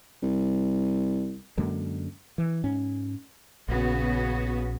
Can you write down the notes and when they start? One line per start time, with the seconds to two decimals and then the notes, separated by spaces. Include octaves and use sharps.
0.22 C2
1.57 F#2 D3 G#3 A#3
2.38 E3
2.64 G#2 C#4
3.68 A#1 C#3 B3 F#4